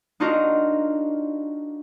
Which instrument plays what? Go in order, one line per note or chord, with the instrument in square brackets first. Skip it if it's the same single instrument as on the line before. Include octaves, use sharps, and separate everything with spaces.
[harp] D4 D#4 F4 F#4 A#4 D#5